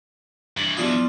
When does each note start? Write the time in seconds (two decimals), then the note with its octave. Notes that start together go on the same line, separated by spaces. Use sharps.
0.57 G2 E3 B5
0.77 F3 G3 B3 E4 F4 D#6